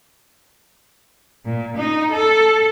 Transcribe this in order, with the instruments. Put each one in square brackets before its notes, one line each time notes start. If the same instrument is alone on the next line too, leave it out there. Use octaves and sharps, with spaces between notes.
[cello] A#2
D#4
A4